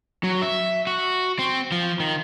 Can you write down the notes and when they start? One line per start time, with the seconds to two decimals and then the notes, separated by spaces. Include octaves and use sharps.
0.24 F#3
0.42 E5
0.87 F#4
1.39 C4
1.72 F3
2.00 D#3